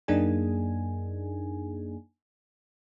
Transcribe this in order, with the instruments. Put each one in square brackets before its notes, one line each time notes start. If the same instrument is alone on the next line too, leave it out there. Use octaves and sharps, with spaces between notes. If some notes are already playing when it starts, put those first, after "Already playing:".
[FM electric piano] F#2 A#3 D4 D#4 G#4 G#5